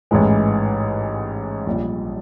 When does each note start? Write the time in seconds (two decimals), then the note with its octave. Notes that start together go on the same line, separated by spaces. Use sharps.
0.11 A1 G#2 E3 G#3
1.67 A#1 A#2 G3